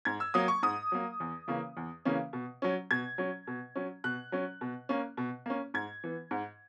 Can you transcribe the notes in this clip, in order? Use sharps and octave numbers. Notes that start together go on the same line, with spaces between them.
G#2 G#6
E6
F#3 A#3 D#6
C#6
G#2 D#6
F#3 A#3
E2
C#3 E3 A#3 C#4
E2
C#3 E3 A#3 C#4
B2
F#3 C#4
B2 G#6
F#3 C#4
B2
F#3 C#4
B2 F#6
F#3 C#4
B2
A#3 C#4
B2
A#3 C#4
G#2 G#6
E3 B3
G#2